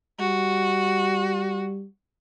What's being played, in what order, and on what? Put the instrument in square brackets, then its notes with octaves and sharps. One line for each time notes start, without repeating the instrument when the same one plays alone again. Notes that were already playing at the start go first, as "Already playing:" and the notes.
[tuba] G3 [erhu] F#4